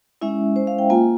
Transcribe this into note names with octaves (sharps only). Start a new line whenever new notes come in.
G#3 C#4 E4 E5
C5
F5
G5
A#3 F4 G#5